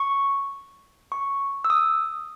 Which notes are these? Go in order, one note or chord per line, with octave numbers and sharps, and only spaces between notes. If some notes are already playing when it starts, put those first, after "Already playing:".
Already playing: C#6
C#6
E6
D#6